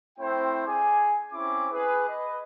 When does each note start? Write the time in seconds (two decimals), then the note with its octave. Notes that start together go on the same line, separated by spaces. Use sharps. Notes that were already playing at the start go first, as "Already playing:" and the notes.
0.19 A3 C4 E4 C5 G5
0.67 G#4 D5 G#5
1.33 C4 C#4 E4 D6
1.72 G#4 B4
2.08 B4 D#5